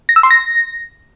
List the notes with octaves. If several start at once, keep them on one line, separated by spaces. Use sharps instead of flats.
A#6
E6
C6
A#6